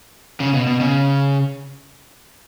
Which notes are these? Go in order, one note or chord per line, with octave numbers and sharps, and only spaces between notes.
C#3
B2
B2
C#3